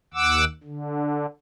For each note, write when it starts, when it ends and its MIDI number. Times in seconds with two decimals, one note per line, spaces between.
0.14 0.45 39
0.14 0.45 78
0.14 0.45 86
0.14 0.45 88
0.63 1.26 50